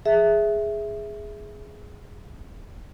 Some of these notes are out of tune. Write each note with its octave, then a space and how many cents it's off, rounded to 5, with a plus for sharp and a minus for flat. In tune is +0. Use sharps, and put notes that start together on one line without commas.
G#4 +0 E5 +0